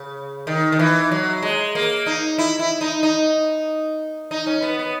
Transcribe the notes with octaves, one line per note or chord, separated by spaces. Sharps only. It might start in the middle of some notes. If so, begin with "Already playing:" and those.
Already playing: C#3
D#3
D#3
E3
F#3
G#3
A#3
D#4
E4
E4
D#4
D#4
D#4
C#4
B3
B3